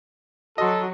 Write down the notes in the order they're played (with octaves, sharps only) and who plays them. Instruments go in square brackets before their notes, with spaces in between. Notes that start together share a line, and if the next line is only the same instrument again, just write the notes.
[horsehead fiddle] F#3 F#4 [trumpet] A4 [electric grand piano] D#5 C6